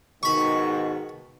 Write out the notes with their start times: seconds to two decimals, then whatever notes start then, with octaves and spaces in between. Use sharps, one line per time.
0.23 G#2 B2 D#3 B5 C#6